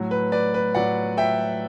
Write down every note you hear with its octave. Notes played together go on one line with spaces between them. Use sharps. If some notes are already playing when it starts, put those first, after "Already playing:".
Already playing: A2 F#3
B4
B4 D5
B4
A2 F#3 D5 F#5
E5 G5